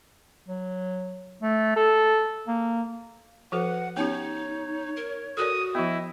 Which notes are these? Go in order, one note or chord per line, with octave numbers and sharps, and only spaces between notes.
F#3
A3
A4
A#3
F3 F#4 A4 B4 F#5
B3 C#4 D#4 G4 C#5
A#4
F#4 A4 A#4 D5 D#6
F3 B3 E4 D#5